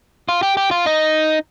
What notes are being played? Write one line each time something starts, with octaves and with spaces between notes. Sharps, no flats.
F4
G4
G4
F4
D#4